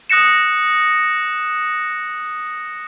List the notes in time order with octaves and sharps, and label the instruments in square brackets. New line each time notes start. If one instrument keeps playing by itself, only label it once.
[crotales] D#6 F#6 A#6 C#7 E7